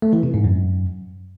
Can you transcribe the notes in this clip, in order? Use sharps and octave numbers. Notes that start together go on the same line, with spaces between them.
A3
E3
C3
G#2
F#2